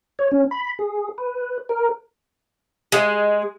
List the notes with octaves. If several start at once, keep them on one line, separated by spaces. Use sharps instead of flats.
C#5
C#4
B5
G#4
B4
A#4
G#3